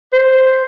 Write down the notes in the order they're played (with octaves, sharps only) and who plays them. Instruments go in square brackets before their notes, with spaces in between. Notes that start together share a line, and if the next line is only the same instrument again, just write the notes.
[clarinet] C5